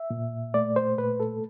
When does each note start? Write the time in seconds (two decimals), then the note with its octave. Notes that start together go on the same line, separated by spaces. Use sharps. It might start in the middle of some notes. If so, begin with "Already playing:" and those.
Already playing: E5
0.10 A#2
0.54 A3 D5
0.76 C5
0.98 A#2 B4
1.20 A4